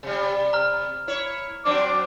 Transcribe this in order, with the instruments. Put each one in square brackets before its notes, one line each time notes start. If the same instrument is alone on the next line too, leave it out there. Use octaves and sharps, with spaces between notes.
[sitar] C3 G3
[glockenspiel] A#5 F6
[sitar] E4 C#5
[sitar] F#3 C4 D4 [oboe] D6